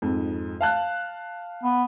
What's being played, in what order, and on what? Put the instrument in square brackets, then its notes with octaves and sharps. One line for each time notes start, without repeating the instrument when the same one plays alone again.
[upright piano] F2 G#2
F5 A5 F#6
[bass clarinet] B3